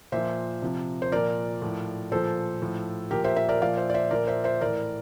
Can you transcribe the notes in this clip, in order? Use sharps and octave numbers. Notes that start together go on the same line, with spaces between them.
A#2 F3 C5 E5
C3 F3
C5
A#2 F3 A#4 D5
A2 F3
A#2 F3 A4 C5
A2 F3
A#2 F3 G4 A#4
C5 E5
C5 E5
A#4 D5
A#2 F3 D5 F5
C5 E5
D5
C5 E5
A#2 F3 A#4 D5
C5 E5
C5 E5
A2 E3 A#4 D5